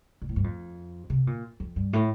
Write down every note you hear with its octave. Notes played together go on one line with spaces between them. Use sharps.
A#2
A2
G2
F2
C3
A#2
F2
G2
A2